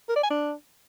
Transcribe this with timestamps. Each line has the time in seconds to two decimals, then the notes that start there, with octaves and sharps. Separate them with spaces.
0.09 A#4
0.16 D5
0.23 G#5
0.30 D4